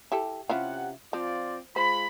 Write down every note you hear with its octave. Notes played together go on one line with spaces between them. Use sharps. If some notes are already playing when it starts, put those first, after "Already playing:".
E4 G4 A4
C3 C#4 E4 F4 G4 F#5
F3 C4 F4 D5
G#3 F4 C5 B5